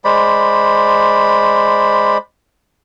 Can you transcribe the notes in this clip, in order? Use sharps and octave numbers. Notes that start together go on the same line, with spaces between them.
G#3 C5 D5 B5